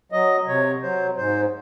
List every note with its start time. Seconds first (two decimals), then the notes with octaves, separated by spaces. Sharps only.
0.12 F#3 D#5
0.47 C3 C#5
0.82 F#3 C5
1.17 G#2 C5